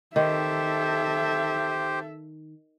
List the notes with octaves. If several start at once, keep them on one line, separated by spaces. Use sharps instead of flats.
D#3 G4 A4 C5 E5